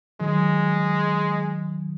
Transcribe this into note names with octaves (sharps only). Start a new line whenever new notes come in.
D#3 F#3 G#3